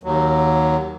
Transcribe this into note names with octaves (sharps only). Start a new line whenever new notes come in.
D#2 F#3